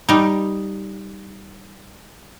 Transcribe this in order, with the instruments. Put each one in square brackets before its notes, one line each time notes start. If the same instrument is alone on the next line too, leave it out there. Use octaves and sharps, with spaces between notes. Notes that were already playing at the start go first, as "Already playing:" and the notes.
[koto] G3 D#4